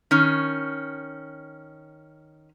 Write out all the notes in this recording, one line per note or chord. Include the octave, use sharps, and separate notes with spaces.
D#3 C#4